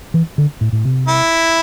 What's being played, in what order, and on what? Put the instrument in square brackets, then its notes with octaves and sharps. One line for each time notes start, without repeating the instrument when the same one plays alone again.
[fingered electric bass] E3
D3
A2
A2
C3
[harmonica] E4